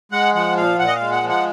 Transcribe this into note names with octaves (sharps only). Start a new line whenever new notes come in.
G#3 F#5
F3 F#5
A#2 F5
A#2 F#5
D#5
F5
G#3
F#5
F3
F#5